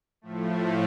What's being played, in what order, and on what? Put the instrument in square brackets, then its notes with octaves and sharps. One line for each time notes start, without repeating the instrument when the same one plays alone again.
[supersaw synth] A2 F3 A3